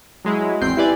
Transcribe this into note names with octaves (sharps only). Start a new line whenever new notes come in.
F#3 G#3 E4
G#1 E2 C4 G5 C7
E4 G4 B4 D5 G#5